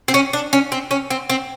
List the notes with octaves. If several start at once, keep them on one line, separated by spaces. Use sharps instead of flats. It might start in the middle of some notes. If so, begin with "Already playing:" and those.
C4
C#4
D4
C#4
C4
C#4
C4
C4